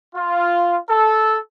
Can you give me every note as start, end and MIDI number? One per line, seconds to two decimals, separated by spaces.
0.15 0.77 65
0.89 1.36 69